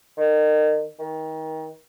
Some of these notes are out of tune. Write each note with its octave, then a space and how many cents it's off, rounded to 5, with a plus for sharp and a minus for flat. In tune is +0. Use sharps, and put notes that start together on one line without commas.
D#3 -30
D#3 +30